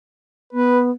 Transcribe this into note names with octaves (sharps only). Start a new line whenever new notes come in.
B3 B4